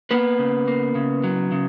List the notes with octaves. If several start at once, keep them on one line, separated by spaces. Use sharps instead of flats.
A#3 B3 B4
C#3
A#3
C#3
F#3
C#3